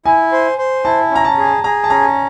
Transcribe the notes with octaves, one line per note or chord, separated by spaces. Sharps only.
E4 G#5
C5
C5
E4 A5
C#4 A#5
A5
G#4
G#4 A#5
A5
C#4 A#5